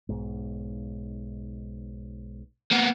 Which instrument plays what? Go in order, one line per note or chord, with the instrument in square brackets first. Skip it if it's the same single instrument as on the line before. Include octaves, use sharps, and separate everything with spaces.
[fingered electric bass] B1 G#2
[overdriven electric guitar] A#3 B3